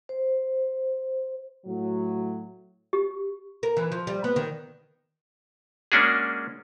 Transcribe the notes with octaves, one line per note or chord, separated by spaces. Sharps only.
C5
A2 F#3
G4
A#4
E3
F3
G3
B3
D#3
G#3 A#3 C#4 D4 F#4 G#4